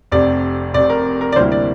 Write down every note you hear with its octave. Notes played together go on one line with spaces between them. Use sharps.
F1 F2 C3 D5
F1 F2 C3 D5
A#4
A#4
D5
D2 C3 G3 A#3 E4 C5
D5